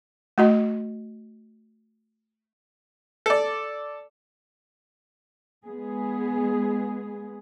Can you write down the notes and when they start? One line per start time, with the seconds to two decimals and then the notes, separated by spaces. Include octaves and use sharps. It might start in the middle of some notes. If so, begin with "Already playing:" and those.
0.38 A3 F#4 D#5
3.26 A4 D5
5.64 G#3 B3 G#4